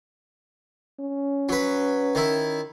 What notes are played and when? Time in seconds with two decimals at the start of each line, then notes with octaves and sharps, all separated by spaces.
1.00 C#4
1.49 F#3 B4
2.15 D#3 E4